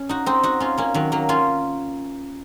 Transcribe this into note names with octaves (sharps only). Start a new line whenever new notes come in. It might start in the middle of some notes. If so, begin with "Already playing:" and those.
Already playing: C#4
D#4 F#4
C4 D#4
D#4 F#4
C#4 F4
A#3 C#4
D#3 F#3
F#3 A#3
C#4 F4